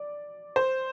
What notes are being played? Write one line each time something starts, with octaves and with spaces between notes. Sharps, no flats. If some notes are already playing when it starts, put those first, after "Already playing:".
Already playing: D5
C5